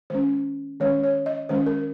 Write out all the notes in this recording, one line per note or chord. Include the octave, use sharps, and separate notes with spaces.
D#3 G#3 C#4 C5
D#3 G#3 C#4 C#5
C#5
D#5
D#3 G#3 C#4 C5
A#4